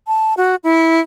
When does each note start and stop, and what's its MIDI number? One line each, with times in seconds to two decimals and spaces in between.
0.07 0.34 81
0.37 0.55 66
0.64 1.00 64